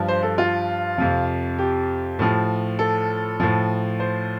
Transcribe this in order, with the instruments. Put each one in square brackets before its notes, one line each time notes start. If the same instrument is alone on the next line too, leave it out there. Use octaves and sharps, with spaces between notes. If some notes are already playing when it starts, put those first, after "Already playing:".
Already playing: [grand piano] G2 F3
C5
A4
F4
F2 C3 F3
G4
A2 F3
A4
A2 F3
C5